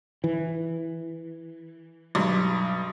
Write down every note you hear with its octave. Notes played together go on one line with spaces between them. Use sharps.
E3
B1 G2